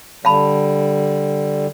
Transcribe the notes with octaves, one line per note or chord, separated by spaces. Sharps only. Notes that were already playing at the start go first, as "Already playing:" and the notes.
D3 G3 F5 A5 B5